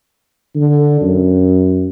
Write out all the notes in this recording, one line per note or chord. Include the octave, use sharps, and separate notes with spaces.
D3
F#2